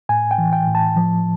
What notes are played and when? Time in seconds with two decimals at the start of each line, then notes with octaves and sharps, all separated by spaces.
0.09 A2 G#5
0.31 G5
0.38 E3
0.53 G5
0.68 A2
0.75 A5
0.96 F3